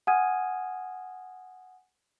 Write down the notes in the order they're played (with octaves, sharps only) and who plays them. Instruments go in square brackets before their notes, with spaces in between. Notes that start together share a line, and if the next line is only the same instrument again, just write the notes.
[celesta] F#5 G#5 D#6 F6 G#6 D#7